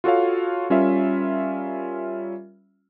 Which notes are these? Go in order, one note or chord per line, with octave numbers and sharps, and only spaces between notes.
F4 F#4 A4 C#5 F5
G3 C#4 F4 A#4 E5